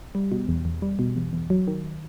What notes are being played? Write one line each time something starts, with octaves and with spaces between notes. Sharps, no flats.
G3
B2
E2
E2
G3
B2
E2
E2
F#3
D#3